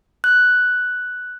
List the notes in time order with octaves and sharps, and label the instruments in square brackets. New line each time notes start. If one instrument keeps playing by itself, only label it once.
[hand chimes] F#6